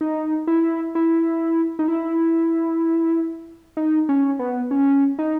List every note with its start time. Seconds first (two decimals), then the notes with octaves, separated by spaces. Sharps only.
0.01 D#4
0.47 E4
0.95 E4
1.79 D#4
1.88 E4
3.77 D#4
4.09 C#4
4.39 B3
4.71 C#4
5.19 D#4